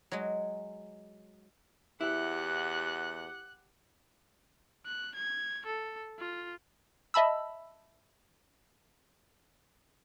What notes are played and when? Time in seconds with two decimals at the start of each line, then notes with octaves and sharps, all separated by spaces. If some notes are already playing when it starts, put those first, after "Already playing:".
0.12 F#3 G#3
2.01 E2 E4 G4 F#5 F#6
4.86 F#6
5.15 G#6
5.66 A4
6.19 F4
7.14 D#5 E5 A5 B5 E6